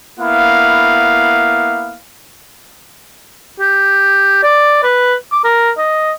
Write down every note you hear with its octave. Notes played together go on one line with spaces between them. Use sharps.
A#3 B3 E4 F5
G4
D5
B4
D6
A#4
D#5